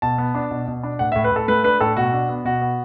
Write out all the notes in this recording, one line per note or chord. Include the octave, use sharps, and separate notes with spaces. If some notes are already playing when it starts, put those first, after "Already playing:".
B2 A5
B3
D4
B2
B2
D4
A2 F#5
E5
A2
B4
A2 A4
A3 B4
D4 B4
A2 A4
B2 F#4
D4
B3
B2 F#4
B3